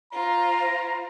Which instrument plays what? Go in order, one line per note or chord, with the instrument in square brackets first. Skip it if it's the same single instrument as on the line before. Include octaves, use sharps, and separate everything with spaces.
[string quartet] F4 C5 [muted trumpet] A#5